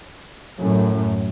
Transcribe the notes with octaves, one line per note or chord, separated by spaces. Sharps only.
F#2 A2